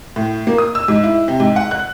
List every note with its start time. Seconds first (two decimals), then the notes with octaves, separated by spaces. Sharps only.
0.16 A2
0.47 A#3
0.58 D#6
0.75 E6
0.88 G#2
1.03 E4
1.28 C3
1.40 G#2
1.56 F#5
1.71 F#6